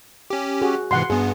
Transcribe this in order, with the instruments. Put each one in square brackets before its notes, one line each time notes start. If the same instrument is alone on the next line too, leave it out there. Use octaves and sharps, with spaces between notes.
[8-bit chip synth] C#4 G4
[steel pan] F#4 G#4
[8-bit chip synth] G#2 C3 E3 [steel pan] F#5 C6
[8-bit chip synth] G2 B3 [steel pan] G#4